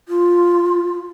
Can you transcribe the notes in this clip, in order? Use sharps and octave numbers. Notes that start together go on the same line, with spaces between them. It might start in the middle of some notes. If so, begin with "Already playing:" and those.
F4